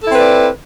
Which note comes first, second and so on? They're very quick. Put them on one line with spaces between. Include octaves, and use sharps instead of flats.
A4 E4 C4 B4 D5